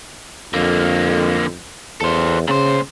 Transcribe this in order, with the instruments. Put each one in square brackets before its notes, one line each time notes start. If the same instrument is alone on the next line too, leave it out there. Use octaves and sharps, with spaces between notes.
[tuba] F2 [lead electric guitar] D3 A#3
[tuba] E2 [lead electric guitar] A4 C5
[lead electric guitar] A#2 C5 [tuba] C#3